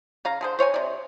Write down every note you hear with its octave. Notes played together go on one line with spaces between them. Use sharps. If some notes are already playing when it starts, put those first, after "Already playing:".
C#3 F5 A#5
D3 G#4 C5
C5 C#5 F5 G#5
C3 D5